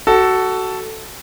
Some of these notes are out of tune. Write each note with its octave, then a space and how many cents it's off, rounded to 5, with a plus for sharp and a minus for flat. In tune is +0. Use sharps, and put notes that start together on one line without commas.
F#4 +20 A4 +0